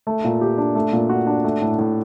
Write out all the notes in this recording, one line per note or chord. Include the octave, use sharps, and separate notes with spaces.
A3
A#2
G4
D4
A3
A#2
F#4
D4
A3
A2
A2